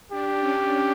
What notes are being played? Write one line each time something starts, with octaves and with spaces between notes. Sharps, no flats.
D4 G4
C#4